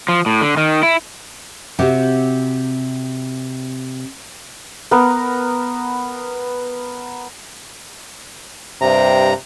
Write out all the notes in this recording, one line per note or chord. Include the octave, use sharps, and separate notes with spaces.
F3
A2
D3
D#3
E4
C3 C4 F#4 G4
B3 A#4
G2 C3 A#5